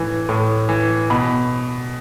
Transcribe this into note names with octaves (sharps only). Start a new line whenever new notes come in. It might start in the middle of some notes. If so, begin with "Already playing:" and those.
Already playing: A2 E3
A2
E3
B2 B5